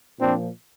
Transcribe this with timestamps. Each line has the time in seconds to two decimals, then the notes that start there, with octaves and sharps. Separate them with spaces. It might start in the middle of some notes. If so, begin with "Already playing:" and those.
0.20 A#2 F3 C4 D4